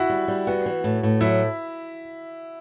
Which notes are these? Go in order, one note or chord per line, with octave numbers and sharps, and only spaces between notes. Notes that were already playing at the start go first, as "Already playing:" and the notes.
Already playing: E4 F#4
G3
G3
B3 F#4
E3
A2
A2
F#3 E4